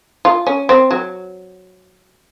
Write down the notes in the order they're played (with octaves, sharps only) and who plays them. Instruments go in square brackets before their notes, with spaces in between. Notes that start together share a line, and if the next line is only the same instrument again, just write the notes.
[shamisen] F4
C#4
C4
F#3